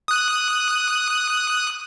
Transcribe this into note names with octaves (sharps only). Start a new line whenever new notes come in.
D#6 F#6